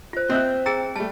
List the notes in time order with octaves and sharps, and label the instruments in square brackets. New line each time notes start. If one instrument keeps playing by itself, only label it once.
[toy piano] F4 C5
[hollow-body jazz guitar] C4 [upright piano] D#5 E5 F#6
[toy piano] G#4 G5 A#5 [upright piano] E6 A6
[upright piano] G3 A3 [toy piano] A5